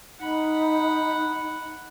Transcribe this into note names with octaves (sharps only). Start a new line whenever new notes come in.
D#4 F#5 B5